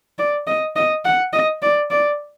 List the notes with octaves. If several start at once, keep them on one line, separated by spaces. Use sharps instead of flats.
D5
D#5
D#5
F#5
D#5
D5
D5